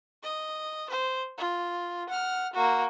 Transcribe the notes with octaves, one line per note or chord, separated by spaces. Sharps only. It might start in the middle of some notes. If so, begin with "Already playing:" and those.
D#5
C5
F4
F#5 F6
A#3 F#4